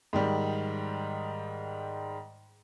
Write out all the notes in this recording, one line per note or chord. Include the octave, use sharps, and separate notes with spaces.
G#2 D#3 G3